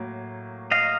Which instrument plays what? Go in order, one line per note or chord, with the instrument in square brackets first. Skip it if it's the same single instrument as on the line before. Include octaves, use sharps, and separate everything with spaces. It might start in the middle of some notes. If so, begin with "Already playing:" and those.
Already playing: [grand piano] A2 F#3 A#3
[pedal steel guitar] D#5 F5